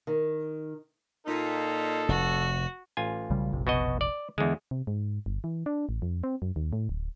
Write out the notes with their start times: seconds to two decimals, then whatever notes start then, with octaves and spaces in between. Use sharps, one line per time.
0.07 D#3
1.26 A#2 D#4 A4
2.08 F1 F#4
2.97 A1 F4 G#5
3.30 B1 C#3 G3
3.52 F1 A#1 C3
3.67 B2 F#4 D#5
4.01 D5
4.38 E2 D3 G#3
4.71 C3
4.87 G#2
5.26 G1
5.44 E3
5.66 D4
5.89 A1
6.02 F2
6.24 C4
6.42 F#2
6.56 D#2
6.73 A2
6.89 D1